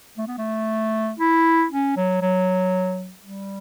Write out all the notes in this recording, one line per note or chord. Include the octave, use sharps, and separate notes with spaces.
A3
B3
A3
E4
C#4
F#3
F#3
G3